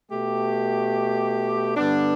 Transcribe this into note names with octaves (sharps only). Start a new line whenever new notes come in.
B2 A3 G4
G2 D3 B3 D4